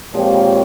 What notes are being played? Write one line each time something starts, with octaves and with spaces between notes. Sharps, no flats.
A#2 F3 G#3 C4 G4 C#5
D#3